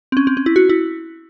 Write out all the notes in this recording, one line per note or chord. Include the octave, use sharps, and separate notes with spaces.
C4
C#4
C4
C#4
E4
F#4
E4